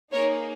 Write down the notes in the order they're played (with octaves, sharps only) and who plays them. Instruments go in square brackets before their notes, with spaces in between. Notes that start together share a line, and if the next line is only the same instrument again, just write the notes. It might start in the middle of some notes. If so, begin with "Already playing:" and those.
[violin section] A#3 D#4 G#4 A#4 C#5